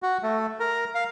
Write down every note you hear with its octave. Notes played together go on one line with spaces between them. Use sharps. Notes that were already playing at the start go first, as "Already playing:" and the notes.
F#4
A3
A#4
F5